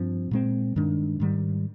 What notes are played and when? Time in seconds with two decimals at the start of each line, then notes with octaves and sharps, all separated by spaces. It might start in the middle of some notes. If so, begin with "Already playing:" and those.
Already playing: G2 F3 C4
0.31 A#2 G#3 C4
0.76 G2 D#3 G#3 D4
1.20 G#2 D#3 G3